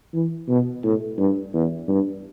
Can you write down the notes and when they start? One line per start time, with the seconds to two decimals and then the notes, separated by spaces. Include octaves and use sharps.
0.14 E3
0.49 B2
0.84 A2
1.18 G2
1.54 E2
1.88 G2